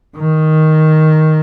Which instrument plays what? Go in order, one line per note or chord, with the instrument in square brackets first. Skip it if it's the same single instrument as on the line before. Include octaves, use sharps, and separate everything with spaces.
[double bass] D#3